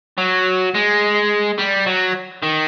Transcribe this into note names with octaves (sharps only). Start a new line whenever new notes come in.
F#3
G#3
G3
F#3
D#3